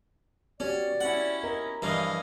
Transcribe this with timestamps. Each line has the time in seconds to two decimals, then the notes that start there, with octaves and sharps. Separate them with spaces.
0.60 B3 C#4 F#4 G4 D5
1.01 C#4 E4 F#5
1.43 B3 A#4 D#5 A#5
1.82 G2 E3 F3 A#4 D#5 F5